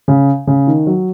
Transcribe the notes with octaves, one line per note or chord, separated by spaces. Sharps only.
C#3
C#3
D#3
F#3